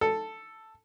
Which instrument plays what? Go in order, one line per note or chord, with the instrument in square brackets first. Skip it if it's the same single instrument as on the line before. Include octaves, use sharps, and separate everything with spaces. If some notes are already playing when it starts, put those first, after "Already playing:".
[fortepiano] A4